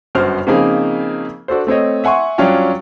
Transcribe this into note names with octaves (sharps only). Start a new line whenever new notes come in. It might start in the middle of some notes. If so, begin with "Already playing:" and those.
G1 F#2 F#4 C5 F6
C#3 F3 A#3 C4 D#4 G#4
D4 F#4 A4 C5
A3 C4 C#5 D#5
E5 F#5 G#5 C6 C#6
G2 F#3 C#4 D4 F4 G5